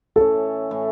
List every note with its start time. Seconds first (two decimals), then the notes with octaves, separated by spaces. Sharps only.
0.16 A2 E3 C#4 A4
0.70 A2 E3 C#4